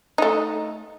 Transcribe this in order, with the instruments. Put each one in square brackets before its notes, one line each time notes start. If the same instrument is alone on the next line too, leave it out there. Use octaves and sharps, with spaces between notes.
[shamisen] A3 D#4